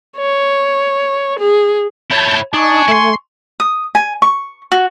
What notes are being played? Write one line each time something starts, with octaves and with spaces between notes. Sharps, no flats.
C#5
G#4
E4 C#5 A5 G6
D4 D#4 G#5 C#6
A3 E4 C6
D#6
G#5
C#6
F#4